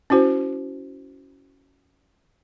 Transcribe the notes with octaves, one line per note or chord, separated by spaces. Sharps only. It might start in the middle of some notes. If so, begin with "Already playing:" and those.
C#4 E4 F#4 C5